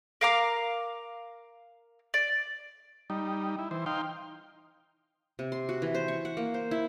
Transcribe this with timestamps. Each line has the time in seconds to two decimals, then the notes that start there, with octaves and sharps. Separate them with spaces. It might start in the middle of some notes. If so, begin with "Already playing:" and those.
0.21 A#4 F5 A#5 D6
2.14 D5
3.10 G3 D#4
3.59 E4
3.71 E3 C5
3.86 D#4 F5 G5 C6
5.39 C3
5.52 C6
5.69 F#4
5.82 E3
5.95 C5
6.08 C#6
6.25 F#5
6.37 A#3
6.54 C5
6.71 E4